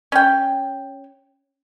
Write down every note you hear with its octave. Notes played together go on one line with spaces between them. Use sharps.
C#4 G5